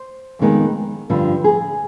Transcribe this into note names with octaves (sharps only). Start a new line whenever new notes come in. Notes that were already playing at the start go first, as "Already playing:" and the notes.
Already playing: C5
F2 D#3 G#3 B3
G2 D3 F3 B4
G#4